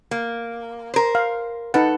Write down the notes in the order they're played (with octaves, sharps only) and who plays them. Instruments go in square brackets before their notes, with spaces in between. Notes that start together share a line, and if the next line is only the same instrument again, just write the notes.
[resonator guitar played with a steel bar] A#3
A#4 C5
[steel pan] F5
[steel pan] D#4 B4 F#5 [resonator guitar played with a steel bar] A4